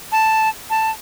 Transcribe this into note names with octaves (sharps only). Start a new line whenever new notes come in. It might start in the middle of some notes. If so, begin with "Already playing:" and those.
A5
A5